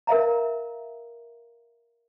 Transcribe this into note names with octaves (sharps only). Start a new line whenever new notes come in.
A#4 E5 F5 A#5